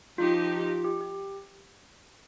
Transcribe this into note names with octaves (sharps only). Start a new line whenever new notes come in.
F3 D#4 F4 G4
F4
G4
G4